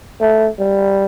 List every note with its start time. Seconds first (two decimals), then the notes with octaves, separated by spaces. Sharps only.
0.21 A3
0.59 G3